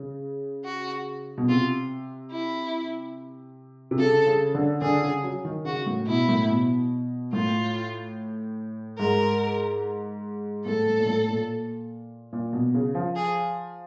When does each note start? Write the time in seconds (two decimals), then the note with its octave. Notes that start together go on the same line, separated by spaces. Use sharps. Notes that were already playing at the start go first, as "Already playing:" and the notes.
Already playing: C#3
0.65 F#4
1.38 B2
1.49 C3 F4
2.32 E4
3.91 C3
3.99 C#3 A4
4.26 C#3
4.55 D3
4.82 D3 G#4
5.02 C#3
5.23 F#3
5.45 D#3
5.65 C#3 F#4
5.86 A2
6.07 B2 E4
6.28 A2
6.49 B2
7.33 A2 F4
8.98 G#2 A#4
10.65 A2 A4
10.87 A2
10.99 A#2
11.07 A2
11.29 A#2
12.33 A#2
12.53 B2
12.74 C#3
12.95 F3
13.16 G#4